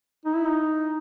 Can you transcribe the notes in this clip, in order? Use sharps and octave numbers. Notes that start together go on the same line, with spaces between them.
D#4
E4
D#4